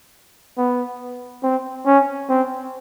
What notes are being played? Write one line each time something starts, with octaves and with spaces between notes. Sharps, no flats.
B3
C4
C#4
C4